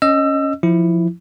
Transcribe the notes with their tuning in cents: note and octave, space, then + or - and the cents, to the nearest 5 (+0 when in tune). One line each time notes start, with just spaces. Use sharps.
C#4 +0 D#5 +0 E6 +25
F3 +0 E4 +0